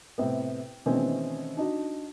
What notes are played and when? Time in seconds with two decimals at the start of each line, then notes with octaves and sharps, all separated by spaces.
0.18 A2 C3 B3
0.86 B2 D#3 E3 A3 C4 C#4
1.57 D4 D#4 F#4